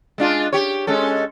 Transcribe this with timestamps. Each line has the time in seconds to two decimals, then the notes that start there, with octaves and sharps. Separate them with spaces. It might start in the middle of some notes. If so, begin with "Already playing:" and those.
0.18 G#3 D4 F4
0.53 G4 C#5
0.87 G#3 C#4 A4